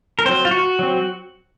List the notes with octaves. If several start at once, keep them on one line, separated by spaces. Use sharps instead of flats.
A#4
F#3 C4 C5
F4
F#4
F#3 C4